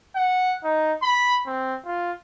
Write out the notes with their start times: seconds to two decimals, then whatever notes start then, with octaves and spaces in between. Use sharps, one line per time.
0.15 F#5
0.64 D#4
1.02 B5
1.46 C4
1.86 F4